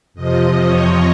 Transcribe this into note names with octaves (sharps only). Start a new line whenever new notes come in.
F2 C3 F3 D#5
C#5